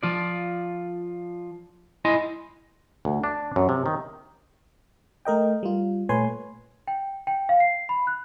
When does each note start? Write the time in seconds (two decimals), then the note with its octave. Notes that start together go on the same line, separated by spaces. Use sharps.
0.03 F3 F4 D5
2.05 E4 D#5 G#5 C6
3.05 D2
3.24 D4
3.56 F#2
3.69 C3
3.86 D#3
5.25 A3 A#4 D#5 G5
5.63 G3 F4
6.09 A#2 A3 B4 C#5 G#5 C6
6.88 G5
7.27 G5
7.49 F5
7.60 C7
7.89 B5
8.07 F#6